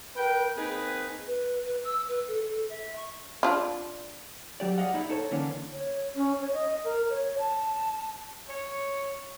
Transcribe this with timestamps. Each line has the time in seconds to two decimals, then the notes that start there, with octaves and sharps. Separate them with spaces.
0.16 A#4 B4 G5
0.56 A#3 C4 D#4 G#4 B4
1.27 B4
1.65 B4
1.84 E6
2.08 B4
2.28 A4
2.49 A4
2.70 E5
2.96 C#6
3.43 D4 F4
4.60 F#3 G4 D5
4.78 G#4 D5 D#5 F5 F#5
4.93 A#2 D#4 E4
5.10 D#4 A4 C5 C#5
5.31 D3 E3 A#3 C#4 D4
5.73 C#5
6.16 C#4
6.41 C#5
6.53 D#5
6.84 A#4
7.10 C#5
7.39 A5
8.49 C#5